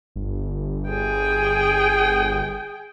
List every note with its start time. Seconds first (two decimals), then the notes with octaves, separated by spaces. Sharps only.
0.16 G1
0.89 G#4 G5